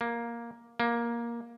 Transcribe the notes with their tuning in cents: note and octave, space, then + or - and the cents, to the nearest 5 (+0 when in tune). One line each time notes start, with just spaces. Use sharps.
A#3 +5
A#3 +10